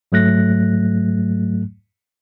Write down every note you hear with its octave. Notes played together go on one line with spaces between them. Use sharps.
G#2 F#3 A3 F#6 A#6